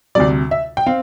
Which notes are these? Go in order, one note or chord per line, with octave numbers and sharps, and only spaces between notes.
D2 C3 G3 D5
E5
G5
C4 F5